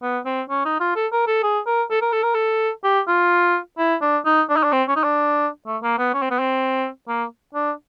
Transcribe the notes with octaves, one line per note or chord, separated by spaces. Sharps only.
B3
C4
C#4
D#4
F4
A4
A#4
A4
G#4
A#4
A4
A#4
A4
A#4
A4
G4
F4
E4
D4
D#4
D4
D#4
D4
C4
C#4
D#4
D4
A3
A#3
B3
C#4
C4
B3
C4
A#3
D4